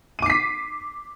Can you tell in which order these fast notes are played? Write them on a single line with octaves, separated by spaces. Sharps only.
D#7 D6 C7 B6